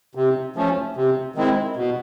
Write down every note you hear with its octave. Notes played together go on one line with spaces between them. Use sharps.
C3
F3 A3 C#4
C3
D#3 G#3 C4 E4
B2